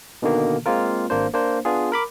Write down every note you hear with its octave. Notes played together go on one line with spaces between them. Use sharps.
B2 D3 D#3 A#3
G#3 A#3 C4 F4 A#4
G#1 A#3 D4 C5
A#3 D4 C5
B3 D4 F4 G#4
A#4 B5 D6